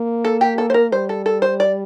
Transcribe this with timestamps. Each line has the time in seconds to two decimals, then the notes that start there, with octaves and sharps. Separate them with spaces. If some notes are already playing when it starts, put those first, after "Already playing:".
Already playing: A#3
0.25 A4
0.41 G4
0.58 A4
0.70 C5
0.74 A#4
0.92 G3 C5
1.09 A4
1.26 A4
1.42 C5
1.60 D5